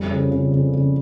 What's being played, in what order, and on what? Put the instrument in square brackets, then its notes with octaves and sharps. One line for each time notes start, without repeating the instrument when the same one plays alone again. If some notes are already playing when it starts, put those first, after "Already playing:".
Already playing: [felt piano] F2 G3
C#3
C#3
C#3
C#3